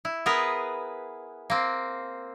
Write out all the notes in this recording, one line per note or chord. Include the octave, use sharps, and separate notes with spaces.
E4
B3 G#4 A#4 B4
A#3 C4